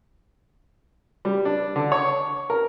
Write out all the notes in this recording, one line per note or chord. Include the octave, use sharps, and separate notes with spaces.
G3
D4
D3
C#5
A#4